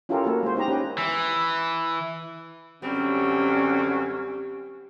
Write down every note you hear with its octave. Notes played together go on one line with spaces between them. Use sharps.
C#4 E4 F4 G4 A4 A#4
A#3 E4 F#4 A4
G#3 C5
B3 D#4 G4 A#5
C#4 G4 B4
E3
F#2 D3 G3 C4 C#4